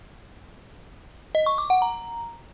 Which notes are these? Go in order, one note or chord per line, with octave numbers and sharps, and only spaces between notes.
D#5
C#6
D6
F#5
A#5